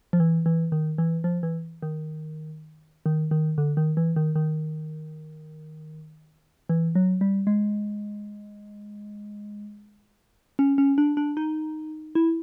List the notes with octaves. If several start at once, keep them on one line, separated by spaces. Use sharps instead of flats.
F3
E3
E3
D#3
E3
F3
E3
D#3
D#3
D#3
D3
D#3
E3
D#3
D#3
E3
F#3
G3
G#3
C#4
C#4
D4
D4
D#4
E4